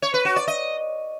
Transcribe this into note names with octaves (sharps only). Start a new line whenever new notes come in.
C#5
B4
F#4
D5
D#5